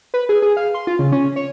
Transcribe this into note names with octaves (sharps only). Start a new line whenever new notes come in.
B4
G#4
G#4
F5
C6
F4
C#3
C#4
C#5